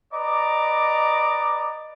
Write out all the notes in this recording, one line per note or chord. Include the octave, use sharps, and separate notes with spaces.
B4 D5 D#5 A#5 D6